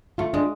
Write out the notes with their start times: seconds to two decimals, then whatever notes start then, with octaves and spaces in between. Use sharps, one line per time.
0.18 A3 F4
0.33 G#3 D4